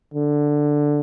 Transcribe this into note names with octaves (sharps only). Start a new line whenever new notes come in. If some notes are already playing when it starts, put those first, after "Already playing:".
D3